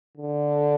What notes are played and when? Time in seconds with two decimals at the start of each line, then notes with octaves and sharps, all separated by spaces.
0.17 D3